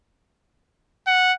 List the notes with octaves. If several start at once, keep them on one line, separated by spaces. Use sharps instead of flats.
F#5